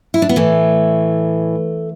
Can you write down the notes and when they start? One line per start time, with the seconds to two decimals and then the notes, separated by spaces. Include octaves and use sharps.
0.14 E4
0.22 D4
0.29 B3
0.36 A2 E3 A3